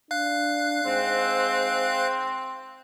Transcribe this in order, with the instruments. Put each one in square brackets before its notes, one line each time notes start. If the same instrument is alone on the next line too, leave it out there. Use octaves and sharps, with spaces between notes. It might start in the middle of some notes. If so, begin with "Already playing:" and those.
[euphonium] D4 [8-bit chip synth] F5 F#6
[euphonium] G#2 [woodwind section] C4